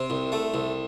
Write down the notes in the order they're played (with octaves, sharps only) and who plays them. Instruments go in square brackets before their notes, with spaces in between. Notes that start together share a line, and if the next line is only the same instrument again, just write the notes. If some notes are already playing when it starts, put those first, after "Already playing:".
Already playing: [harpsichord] C3
C2
A3
C2